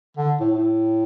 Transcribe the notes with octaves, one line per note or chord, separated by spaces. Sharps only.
D3
A2
A2